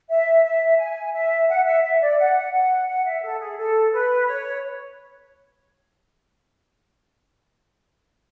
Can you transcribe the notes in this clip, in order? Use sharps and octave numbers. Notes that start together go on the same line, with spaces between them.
E5
E5
G#5
E5
F#5
E5
E5
D5
F#5
F#5
F#5
E5
A4
G#4
A4
B4
C#5